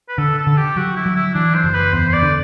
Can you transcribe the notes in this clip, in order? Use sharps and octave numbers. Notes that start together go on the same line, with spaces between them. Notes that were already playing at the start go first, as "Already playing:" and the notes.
B4
D3 A4
A4
D3
G4
F#3 F#4
E4
F#3
E4
E3 D4
C5
F#1
B4
E2 C5
C5
D5
D3